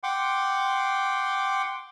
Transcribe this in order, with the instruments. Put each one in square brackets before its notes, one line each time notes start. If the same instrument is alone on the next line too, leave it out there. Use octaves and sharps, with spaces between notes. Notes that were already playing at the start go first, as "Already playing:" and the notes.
[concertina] F#5 G5 C6 D6